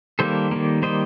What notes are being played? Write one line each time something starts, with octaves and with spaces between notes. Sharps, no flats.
D#3 G3 A#3 A4 C5
D#3 G3 A#3
D#3 G3 A#3 C5 D#5